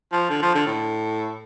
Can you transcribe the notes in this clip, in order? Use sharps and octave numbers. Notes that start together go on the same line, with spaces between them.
F3
D3
F3
D3
A2